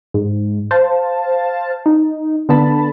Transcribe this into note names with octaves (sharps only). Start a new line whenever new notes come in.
G#2
C5 F5 A5
D#4
D3 B3 A5 B5